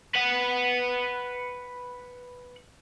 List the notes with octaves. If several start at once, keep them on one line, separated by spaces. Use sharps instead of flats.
B4 F#5